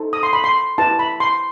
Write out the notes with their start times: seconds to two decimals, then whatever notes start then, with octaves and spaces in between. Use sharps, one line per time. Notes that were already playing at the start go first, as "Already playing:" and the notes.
Already playing: D#4 A4 C5
0.13 D#6
0.23 C6
0.33 B5
0.44 C6
0.78 E4 G4 B4 A5
0.99 B5
1.20 C6